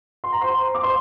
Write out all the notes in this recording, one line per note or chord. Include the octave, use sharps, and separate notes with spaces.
C6
A#5
C5 C6
D6
C5 C6